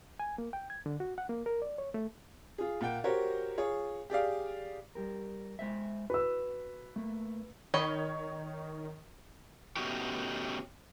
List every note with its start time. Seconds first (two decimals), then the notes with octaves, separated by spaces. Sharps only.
0.20 G#5
0.38 A#3
0.53 G5
0.70 G#6
0.86 D3
1.00 F#4
1.18 F#5
1.29 A#3
1.46 A#4
1.62 D5
1.78 C#5
1.94 A3
2.58 F4 G#4
2.81 A#2 F#5 G5
3.04 F#4 G4 A#4 C5 C#5
3.58 F4 G#4 C#5
4.10 G4 G#4 D5 F5
4.95 G3 G4 A#4
5.59 G#3 C5 E5
6.10 F#4 B4 E6
6.96 A3 A#3
7.74 D#3 C#5 D#5 B5
9.76 A3 B3 C#4 D#4 F#4 G4